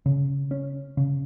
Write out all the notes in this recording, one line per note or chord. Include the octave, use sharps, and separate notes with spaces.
C#3
C#4
C#3